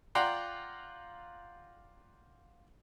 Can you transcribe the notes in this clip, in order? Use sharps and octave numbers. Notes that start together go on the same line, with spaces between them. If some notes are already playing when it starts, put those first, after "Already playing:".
F4 D5 F#5 G5 A#5 C6